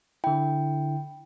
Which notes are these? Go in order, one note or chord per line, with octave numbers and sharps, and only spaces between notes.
D3 E4 G5